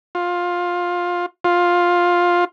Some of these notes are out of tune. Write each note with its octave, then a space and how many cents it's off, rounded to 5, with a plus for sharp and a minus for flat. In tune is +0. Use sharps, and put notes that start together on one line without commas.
F4 +15
F4 +10